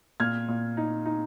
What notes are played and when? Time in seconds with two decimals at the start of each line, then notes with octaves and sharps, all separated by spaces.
0.20 A#2 F6 G#6
0.48 A#2
0.77 D#4
1.06 D#4